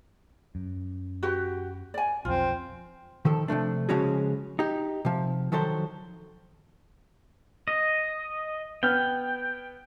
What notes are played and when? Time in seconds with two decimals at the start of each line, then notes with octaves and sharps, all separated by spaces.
0.55 F#2
1.23 F#4 G4 B4
1.94 D5 G#5
2.25 B1 F2 C4 F4
3.25 D#3 F3 A4
3.48 C3 F3 A3 D4
3.89 C#3 F3 G#3 C#4 F#4 G#4
4.59 D#4 G4
5.05 C3 F3
5.52 D#3 F3 F#3 A4 C5
7.68 D#5
8.83 B3 G5 F6